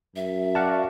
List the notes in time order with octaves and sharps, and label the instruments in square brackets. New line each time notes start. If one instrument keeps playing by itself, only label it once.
[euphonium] F#2 [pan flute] E5
[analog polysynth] F#4 D5 F5 [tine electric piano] F#5 A5